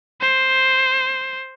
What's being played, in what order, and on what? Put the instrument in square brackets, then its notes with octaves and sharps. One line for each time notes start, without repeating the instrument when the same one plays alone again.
[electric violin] C5